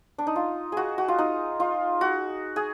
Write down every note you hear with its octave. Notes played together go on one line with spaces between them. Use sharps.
D4
D#4
F4
F#4 G#4
F#4
F4
D#4
F4
F#4
G#4